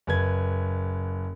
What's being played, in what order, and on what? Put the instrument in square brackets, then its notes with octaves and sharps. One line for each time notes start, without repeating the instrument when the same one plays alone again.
[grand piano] F#1 B4 G#6